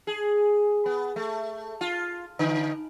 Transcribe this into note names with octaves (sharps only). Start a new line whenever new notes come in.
G#4
B3
A3
F4
D3